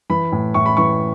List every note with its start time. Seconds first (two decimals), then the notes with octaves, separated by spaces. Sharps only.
0.10 E3 B5
0.32 A2
0.54 A2 C#6
0.66 B5
0.77 E3 C#6